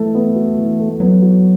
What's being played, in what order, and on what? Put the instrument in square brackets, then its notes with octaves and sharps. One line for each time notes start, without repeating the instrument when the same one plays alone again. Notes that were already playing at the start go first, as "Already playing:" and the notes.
Already playing: [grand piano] E3 A4 [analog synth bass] A3
[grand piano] B3
F#4
E3
A4
[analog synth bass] F#3 [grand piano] B3
[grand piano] F#4